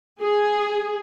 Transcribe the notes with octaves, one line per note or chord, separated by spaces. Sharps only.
G#4